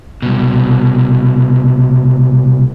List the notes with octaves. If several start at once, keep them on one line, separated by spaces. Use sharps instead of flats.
C2 B2